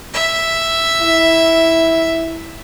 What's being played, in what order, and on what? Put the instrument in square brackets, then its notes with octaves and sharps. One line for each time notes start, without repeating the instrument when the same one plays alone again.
[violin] E5
[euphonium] E4